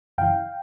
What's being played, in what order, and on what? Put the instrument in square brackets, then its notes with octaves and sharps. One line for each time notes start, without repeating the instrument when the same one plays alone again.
[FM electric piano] F#2 C#3 E3 F5 G5